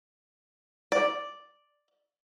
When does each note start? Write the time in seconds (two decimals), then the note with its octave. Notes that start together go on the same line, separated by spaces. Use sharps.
0.92 D5